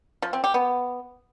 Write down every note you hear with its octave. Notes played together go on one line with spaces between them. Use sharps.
F3
C4
G4
B3